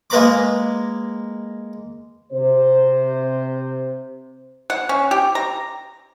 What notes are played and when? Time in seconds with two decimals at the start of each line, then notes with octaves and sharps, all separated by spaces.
0.10 G#3 A#3 B4 A#5 B5 D6
2.32 C3 C5
4.70 F#5
4.89 C#4
5.11 G4
5.35 A#5